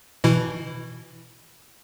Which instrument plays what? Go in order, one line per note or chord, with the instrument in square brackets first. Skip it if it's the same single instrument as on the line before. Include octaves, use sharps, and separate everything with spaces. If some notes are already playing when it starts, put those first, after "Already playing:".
[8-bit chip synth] B2 E3 E4